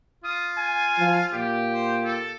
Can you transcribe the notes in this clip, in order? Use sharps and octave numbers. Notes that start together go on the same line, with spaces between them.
F4 D#6
G#5
F3
A#2 G4
C5
A4